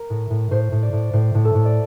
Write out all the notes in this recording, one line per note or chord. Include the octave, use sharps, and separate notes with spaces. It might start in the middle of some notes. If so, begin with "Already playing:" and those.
Already playing: A#4
A2
A2
A2 C5
A2
D5
A2
A2 C5
A2
A4
A2
D5